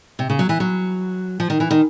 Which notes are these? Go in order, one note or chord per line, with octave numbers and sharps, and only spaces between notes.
C3
C#3
F#3
E3
F#3
F3
D#3
E3
D#3